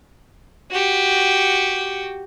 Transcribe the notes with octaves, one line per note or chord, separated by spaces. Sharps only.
F#4 G4